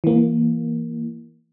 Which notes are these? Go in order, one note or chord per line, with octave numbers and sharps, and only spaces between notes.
E3 A#3